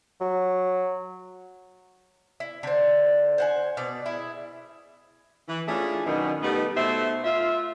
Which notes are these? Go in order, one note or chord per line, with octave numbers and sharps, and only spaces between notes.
F#3
E4
D3 C5
C5 F#5 G#5
B2 D5
E4 G#4
E3
A3 C#4 D4 E4 F4 G#4
F#2 B2 D#3
G3 A3 B3 D#4
B2 A3 C5 E5
F4 E5